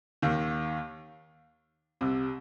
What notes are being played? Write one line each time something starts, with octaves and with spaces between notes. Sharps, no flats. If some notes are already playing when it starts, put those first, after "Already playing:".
D#2 D#3
C2 C3